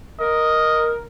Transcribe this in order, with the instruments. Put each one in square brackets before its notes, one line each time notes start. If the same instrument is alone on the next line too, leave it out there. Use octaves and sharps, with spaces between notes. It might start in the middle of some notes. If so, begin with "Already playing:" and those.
[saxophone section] A#4 [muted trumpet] D#5